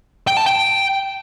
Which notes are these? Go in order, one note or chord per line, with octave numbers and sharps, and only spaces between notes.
G5
A5
G5